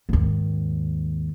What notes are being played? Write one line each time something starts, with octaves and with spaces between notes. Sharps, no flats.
D#2 G#2